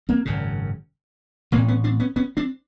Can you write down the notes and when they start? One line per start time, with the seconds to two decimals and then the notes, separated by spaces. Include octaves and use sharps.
0.09 A#3 C4
0.25 G#1 F#2 C#3
1.52 A1 A#3 C4
1.56 A2
1.68 B3 C#4
1.84 C4 D4
2.00 B3 C#4
2.16 B3 C#4
2.37 C4 D4